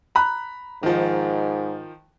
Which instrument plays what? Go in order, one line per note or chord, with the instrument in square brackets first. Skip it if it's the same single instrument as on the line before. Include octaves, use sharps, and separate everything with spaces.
[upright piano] A#5 B5 F#6
[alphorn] G#2 [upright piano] D#3 F3